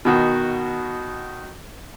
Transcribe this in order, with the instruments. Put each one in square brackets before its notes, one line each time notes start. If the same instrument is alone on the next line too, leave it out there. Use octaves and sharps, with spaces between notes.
[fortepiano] B2 D#3 F#4